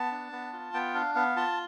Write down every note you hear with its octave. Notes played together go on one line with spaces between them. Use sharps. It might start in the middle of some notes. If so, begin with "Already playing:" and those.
Already playing: B3 A5
D4
B3
F4
B3 G5
D4 F5
B3 F5
F4 A5